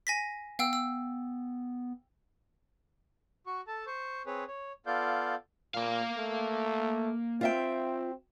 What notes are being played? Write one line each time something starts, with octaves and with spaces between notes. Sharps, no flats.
G#5 A#6 B6
B3 F5 G5 E6
E6
F#4 C#6
A4 A5
C5 C#6
C4 G#4 B4 C#5
C#5
B3 F4 A4 D5 F5 G6
A#2 A#3 F5
A3
C4 F4 E5 G5